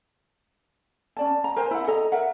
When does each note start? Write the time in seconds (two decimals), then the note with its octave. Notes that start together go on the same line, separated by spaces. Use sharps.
1.17 C#4 D5 A5
1.44 A#5
1.56 A#4 C5 G#5 A#5
1.71 E4 F#5
1.87 A4 D#5 A#5
2.12 A#4 E5 F#5